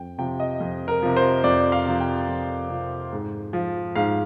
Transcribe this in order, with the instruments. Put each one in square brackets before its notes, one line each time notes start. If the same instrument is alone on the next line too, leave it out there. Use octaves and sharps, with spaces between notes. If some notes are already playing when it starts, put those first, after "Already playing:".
Already playing: [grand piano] F2 G5
C3 F3 G5
D#5
F2
A#4
C3 F3
C5
F2 D5
F5
C3 F3
G5
F2
C3 F3
G#2
F3
G#2 F5